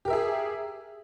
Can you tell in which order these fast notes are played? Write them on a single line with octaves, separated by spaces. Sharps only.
G4 A#4 E5 G#4